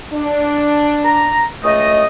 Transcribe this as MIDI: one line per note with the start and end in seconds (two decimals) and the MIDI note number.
0.13 1.42 62
1.05 1.45 82
1.64 2.04 37
1.64 2.04 57
1.64 2.04 75